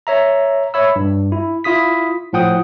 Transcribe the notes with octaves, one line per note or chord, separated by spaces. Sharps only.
C#5 E5 A#5
C#5 E5 B5 E6
G2
E4
E4 F4 D#6 B6
A2 F3 F#5 G5 D#6